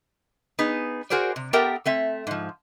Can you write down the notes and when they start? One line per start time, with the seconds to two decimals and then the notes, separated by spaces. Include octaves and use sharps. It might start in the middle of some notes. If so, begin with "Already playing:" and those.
0.59 B3 D#4 G#4
1.10 F#4 G#4 A#4 C5 D5
1.36 C3
1.53 B3 G4 A4 A#4 E5 G5
1.86 A3 C4 E5
2.27 G#2 F3